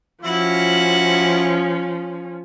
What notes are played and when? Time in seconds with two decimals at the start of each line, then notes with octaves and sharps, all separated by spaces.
0.24 F3 C#4 E4 F#4